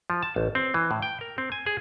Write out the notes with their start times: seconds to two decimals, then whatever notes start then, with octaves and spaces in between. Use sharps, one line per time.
0.10 F3
0.23 A5
0.36 A1
0.55 C4
0.74 E3
0.91 A2
1.02 G5
1.21 A#4
1.38 C4
1.52 G#5
1.66 G#4